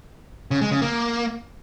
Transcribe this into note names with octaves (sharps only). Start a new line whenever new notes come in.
C#3
G#3
C#3
A#3